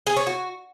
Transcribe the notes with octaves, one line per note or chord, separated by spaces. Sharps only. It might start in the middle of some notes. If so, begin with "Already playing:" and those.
G#4
C#5
F#4